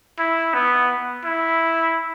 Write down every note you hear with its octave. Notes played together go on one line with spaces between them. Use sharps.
E4
B3
E4